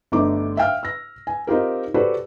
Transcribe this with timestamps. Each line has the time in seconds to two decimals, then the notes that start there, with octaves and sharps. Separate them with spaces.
0.12 G1 D3 A3 D#4 D6
0.57 E5 F5 G5 F6
0.83 E6 A#6
1.27 G#5
1.47 C4 D#4 F4 G4 A#4
1.94 F#4 G4 A4 B4 C5 D5